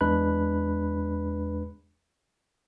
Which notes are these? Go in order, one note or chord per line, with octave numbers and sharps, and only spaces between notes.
E2 G#3 D4 B4 B5 F#6